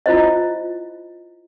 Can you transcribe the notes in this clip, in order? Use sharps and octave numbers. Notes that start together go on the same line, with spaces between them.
E4 F4 C5 D#5